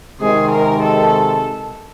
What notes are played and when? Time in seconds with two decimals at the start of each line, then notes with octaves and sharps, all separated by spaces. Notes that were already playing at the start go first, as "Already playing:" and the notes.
0.20 C3 D#3 G#3 G#4
0.51 A#4
0.82 A4